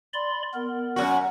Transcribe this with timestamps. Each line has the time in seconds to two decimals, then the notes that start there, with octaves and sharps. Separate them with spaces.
0.14 D5 B5 C6
0.54 B3 A#4
0.96 F#2 A2 F#4